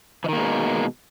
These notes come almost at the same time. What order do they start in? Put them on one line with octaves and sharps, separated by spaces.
E3 D#3 A#3 G#3 B2